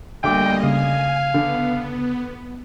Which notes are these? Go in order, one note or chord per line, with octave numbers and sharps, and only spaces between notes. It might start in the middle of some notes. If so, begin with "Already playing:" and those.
D2 G3 A#3 D#5 G5 D6
C#3 F5 G#5
D3 B3